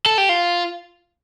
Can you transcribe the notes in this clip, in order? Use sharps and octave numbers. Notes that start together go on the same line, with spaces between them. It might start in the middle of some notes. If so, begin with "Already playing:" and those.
A4
G4
F4